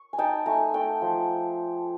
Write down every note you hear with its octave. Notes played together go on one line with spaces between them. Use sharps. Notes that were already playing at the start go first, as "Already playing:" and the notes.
Already playing: C#6
G#5
D#4 G5 A5
A3 G#5 A#5
A3 G5 A5
F3